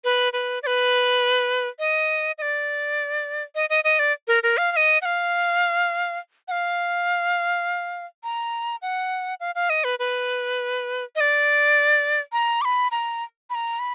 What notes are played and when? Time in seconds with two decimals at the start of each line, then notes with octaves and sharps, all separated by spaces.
0.04 B4
0.33 B4
0.63 D5
0.67 B4
1.79 D#5
2.38 D#5
2.42 D5
3.55 D#5
3.70 D#5
3.84 D#5
3.99 D5
4.28 A#4
4.43 A#4
4.57 F5
4.72 F5
4.76 D#5
5.02 F#5
5.05 F5
6.48 F#5
6.51 F5
8.23 A#5
8.82 F#5
9.40 F5
9.55 F5
9.70 D#5
9.84 B4
9.99 B4
11.16 D#5
11.20 D5
12.32 A#5
12.61 D6
12.65 B5
12.91 A#5
13.50 B5
13.55 A#5
13.79 B5